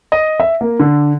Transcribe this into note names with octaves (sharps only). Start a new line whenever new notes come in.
D#5
E5
A#3
D3